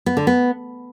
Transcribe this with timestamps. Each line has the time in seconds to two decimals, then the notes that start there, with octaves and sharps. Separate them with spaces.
0.06 B3
0.17 D3
0.27 B3